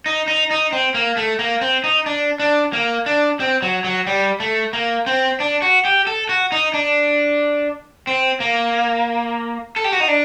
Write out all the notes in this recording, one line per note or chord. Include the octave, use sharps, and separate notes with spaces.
D#4
D#4
D#4
C4
A#3
A3
A#3
C4
D#4
D4
D4
A#3
D4
C4
F#3
F#3
G3
A3
A#3
C4
D4
F#4
G4
A4
F#4
D#4
D4
C4
A#3
A4
G4
F#4
D#4
D4